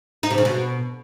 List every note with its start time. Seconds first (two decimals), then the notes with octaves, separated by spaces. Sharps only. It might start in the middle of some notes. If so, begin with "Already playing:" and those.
0.23 D#4
0.31 C3
0.38 C#3
0.45 B2